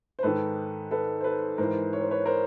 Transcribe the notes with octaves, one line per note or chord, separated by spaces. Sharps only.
C5
G#2 D#3 A4 B4
A4 B4
C5
A4 B4
G#2 E3 A#4 C5
C#5
C5
B4 C#5
A#4 C5